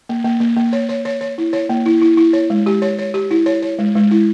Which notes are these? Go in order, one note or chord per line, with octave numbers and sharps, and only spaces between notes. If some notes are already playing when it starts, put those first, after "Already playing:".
A#3
A#3
A#3
A#3
C#5
C#5
C#5
C#5
E4
C#5
A#3
E4
E4
E4
C#5
G#3
G4
C#5
C#5
G4
E4
C#5
C#5
G#3
G#3
E4